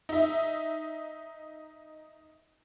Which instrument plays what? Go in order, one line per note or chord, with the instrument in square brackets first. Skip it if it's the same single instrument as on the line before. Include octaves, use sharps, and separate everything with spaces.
[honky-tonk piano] D#4 E5